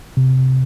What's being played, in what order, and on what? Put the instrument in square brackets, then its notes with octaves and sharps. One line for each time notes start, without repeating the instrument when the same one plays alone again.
[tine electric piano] C3